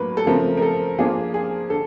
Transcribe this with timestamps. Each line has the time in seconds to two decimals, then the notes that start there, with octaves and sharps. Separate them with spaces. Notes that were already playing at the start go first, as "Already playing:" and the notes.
Already playing: A2 F#3 A#3 D4 B4
0.17 A4
0.26 C#3 F3 A3 C4 A#4
0.57 A#4
0.62 A4
0.99 F3 A#3 D4 F4 G#4
1.34 G#4
1.70 D3 A4